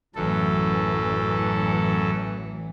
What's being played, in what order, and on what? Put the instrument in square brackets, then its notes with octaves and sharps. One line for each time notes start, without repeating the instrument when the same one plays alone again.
[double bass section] A1 E3 F#3 [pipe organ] F#2 A4